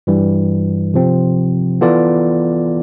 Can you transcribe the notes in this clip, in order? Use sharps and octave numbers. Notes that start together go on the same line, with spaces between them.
G2 E3 G3
C3 F3 C4
E3 B3 F4 A4 D5